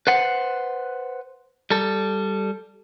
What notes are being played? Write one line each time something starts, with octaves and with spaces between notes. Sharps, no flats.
B4 C5 F#5
G3 A4